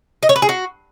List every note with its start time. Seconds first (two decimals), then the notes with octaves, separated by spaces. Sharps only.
0.23 D#5
0.29 C#5
0.36 B4
0.42 G#4
0.49 F#4